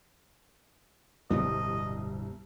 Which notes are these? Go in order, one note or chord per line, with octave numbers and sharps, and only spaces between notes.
D1 C2 G2 B2 G3 D4 D#5